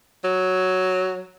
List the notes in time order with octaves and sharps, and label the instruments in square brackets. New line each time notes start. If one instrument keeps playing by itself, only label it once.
[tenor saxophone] F#3